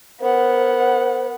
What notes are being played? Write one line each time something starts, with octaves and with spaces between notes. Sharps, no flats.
B3 A#4 C5 F#5